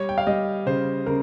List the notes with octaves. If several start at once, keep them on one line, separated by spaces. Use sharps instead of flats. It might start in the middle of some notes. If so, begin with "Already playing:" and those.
Already playing: G3 C#5
G5
F5
G3 D#5
C#3 C5
C#3 A#4